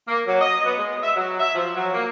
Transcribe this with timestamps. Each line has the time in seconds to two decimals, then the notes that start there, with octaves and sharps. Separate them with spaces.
0.08 A#3
0.27 F#3
0.41 D#5
0.65 B3
0.78 G#3
1.03 E5
1.15 F#3
1.39 E5
1.55 F3
1.76 F#3
1.93 A#3